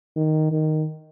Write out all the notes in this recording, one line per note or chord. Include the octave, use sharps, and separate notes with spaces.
D#3
D#3